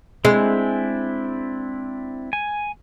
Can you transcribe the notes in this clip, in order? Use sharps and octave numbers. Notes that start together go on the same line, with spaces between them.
G#3 C4 D4 E4
G#5